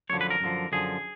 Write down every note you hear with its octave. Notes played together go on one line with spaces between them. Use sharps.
F#2 D3 F3 C#5
B4
A#4
F#2 D3 F3
F#2 D3 F3 G#4